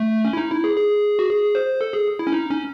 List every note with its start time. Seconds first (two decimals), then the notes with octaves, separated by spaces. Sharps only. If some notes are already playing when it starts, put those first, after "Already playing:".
Already playing: A3
0.25 C#4
0.33 E4
0.37 D#4
0.51 E4
0.64 G#4
0.77 G#4
1.19 F#4
1.29 G#4
1.55 C5
1.81 A4
1.93 G#4
2.19 E4
2.27 C#4
2.32 D#4
2.50 C#4